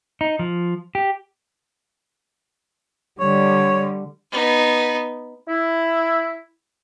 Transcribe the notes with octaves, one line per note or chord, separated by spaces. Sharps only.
D#4
F3
G4
D3 G3 C#5
B3 D#4
E4